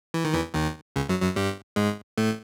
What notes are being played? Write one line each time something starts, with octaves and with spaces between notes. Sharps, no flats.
E3
D#3
E2 E3
D#2 D#3
C#2 C#3
F#2 F#3
F#2 F#3
G2 G3
G#2 G#3
A2 A3